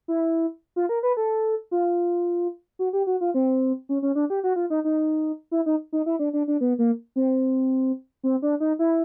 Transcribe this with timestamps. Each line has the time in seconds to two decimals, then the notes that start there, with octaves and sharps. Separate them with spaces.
0.08 E4
0.76 F4
0.89 A#4
1.03 B4
1.17 A4
1.71 F4
2.79 F#4
2.93 G4
3.07 F#4
3.21 F4
3.34 C4
3.89 C#4
4.02 C#4
4.15 D4
4.30 G4
4.44 F#4
4.56 F4
4.70 D#4
4.84 D#4
5.51 E4
5.66 D#4
5.93 D#4
6.06 E4
6.19 D4
6.33 D4
6.48 D4
6.61 B3
6.79 A#3
7.16 C4
8.23 C4
8.42 D4
8.60 D#4
8.79 E4